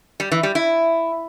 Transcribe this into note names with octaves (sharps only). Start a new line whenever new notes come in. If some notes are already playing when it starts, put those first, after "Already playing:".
G3
E3
G3
E4